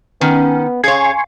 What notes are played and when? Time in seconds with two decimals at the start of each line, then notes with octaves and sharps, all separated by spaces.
0.21 D#3 B3 C#4
0.84 C#3 G#4 C#5 F5 G#5 C6 C#6